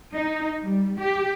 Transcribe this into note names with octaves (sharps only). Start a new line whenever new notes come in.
D#4
G3
G4